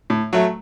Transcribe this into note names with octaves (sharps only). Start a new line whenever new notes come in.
A2
F#3 A3